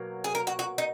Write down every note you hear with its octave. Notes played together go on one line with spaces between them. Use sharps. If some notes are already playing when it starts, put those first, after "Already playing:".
Already playing: B2 F#3 A#3
G#4
A#4
F#4
F#4
D#4